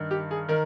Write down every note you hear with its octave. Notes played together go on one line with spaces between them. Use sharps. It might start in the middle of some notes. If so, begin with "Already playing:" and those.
Already playing: G2 D#3
G4
G#4
D#3 A#4